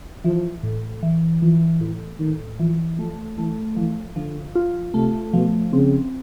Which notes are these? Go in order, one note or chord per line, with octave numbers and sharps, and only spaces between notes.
E3 F3
A2
E3
E3 F3
A2 E3
A2 D#3
E3 F3
F3 A3
E3 A3
E3 F3
D3 F3
F4
C3 A3
B2 F3
C#3 C4